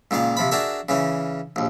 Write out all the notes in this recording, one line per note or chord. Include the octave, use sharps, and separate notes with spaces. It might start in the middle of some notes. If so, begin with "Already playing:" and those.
C#2 A#2 D#3 F5
C3 F3 B5
D4 F#4 G#4 A#4 E5
C#3 E3 C#4
A#1 D#2